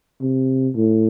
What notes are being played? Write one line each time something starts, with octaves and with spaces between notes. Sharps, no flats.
C3
A2